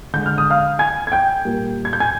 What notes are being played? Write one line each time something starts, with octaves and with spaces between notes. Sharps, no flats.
D3 G#3 G6
F6
D#6
F5 F6
G#5 G#6
G#6
G5 G6
A#2 G3 A#3
G#6
G6
G#5 G#6